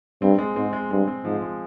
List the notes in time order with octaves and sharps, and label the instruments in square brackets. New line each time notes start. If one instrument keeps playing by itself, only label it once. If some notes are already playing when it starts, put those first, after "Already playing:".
[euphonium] G2 [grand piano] C4
[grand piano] G#3
[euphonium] G#2 [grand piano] C4
[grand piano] G#3
[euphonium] G2 [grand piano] G#3
[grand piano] C4
[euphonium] G#2 [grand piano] F3
[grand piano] G#3